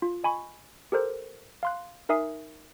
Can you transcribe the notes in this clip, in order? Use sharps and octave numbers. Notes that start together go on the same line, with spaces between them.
F4
D#5 G#5 B5 C#6
G4 A4 A#4 C5
F5 C6 F#6
D#4 A#4 E5 G#5 D#6 C7